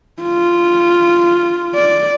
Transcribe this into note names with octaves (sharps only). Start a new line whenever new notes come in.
F4
D5